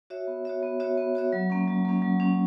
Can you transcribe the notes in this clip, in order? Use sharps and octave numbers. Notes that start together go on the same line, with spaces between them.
F#4 C#5 E5
B3
F#4 C#5 E5
B3
F#4 C#5 E5
B3
F#4 C#5 E5
F#3
A#3 C#4
F#3
A#3 C#4
F#3
A#3 C#4